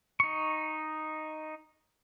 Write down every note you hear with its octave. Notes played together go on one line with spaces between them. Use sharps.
D#4 C#6